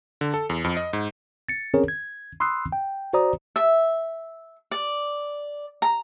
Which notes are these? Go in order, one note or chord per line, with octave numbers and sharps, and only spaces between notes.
D3
A4
E2
F2
D#5
G#2
A6 C#7
C4 C#4 G#4 A#4 C#5
G#6
B5 C6 D#6 E6 F#6 C7
G5
F#4 C5 D5 A#5 D#6
E5
D5
A#5